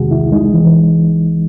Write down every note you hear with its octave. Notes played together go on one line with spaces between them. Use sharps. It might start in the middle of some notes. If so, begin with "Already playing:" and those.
Already playing: E2 C3 D#3 G#3 F#4 G#4
C2 E4
G#3 D#4
E3